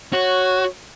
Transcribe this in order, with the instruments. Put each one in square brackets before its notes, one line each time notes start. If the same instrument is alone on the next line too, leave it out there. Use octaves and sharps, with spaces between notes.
[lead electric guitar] F#4 [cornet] C#5